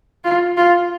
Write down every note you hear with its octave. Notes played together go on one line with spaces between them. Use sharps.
F4
F4